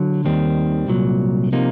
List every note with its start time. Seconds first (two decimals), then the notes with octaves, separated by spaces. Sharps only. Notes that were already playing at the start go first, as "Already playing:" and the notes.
Already playing: D3 F#3
0.25 D#2 D#3 G3 C4
0.88 C2 A#2 F#3
1.52 C3 F3 A#3 D#4